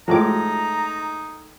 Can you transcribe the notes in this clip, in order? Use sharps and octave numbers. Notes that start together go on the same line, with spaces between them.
A2 F3 G#3 D#4 F#4 A#5 D6